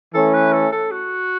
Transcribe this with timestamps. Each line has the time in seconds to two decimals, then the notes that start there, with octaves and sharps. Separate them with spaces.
0.14 E3 A3 C#4 A4
0.33 B4
0.52 A4
0.72 A4
0.91 F#4